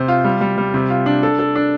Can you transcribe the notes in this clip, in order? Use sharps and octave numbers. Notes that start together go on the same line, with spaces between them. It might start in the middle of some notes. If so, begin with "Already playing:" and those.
Already playing: C3 C5
F4
G3
G3
G3
C3
F4
D4
A4
A4
D4